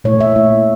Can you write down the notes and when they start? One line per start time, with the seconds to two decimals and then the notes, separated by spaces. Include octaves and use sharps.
0.04 A#2 A3 E4 C#5
0.20 E5
0.36 A#2 A3 E4